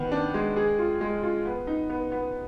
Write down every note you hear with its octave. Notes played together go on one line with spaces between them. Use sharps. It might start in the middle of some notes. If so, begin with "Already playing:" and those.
Already playing: D#3 B3
D4
G#3
G#4
F4
G#3
F4
B3
D#4
B3
B3